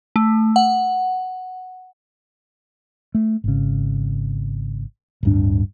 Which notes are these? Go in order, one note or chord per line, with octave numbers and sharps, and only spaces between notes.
A3
F#5
A3
G#1 C#3
D1 G2 D4